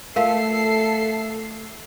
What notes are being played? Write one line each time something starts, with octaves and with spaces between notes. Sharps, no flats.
A3 F4 A4 A#4 E5 F5 C7